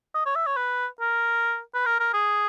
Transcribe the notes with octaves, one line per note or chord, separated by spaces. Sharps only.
D#5
C#5
E5
C#5
B4
A#4
B4
A#4
A#4
G#4